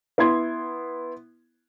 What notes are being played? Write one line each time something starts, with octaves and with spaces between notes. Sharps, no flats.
B3 E4 C6 G#6